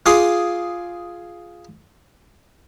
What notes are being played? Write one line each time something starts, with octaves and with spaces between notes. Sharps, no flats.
F4 G#4 C6 D6 D#6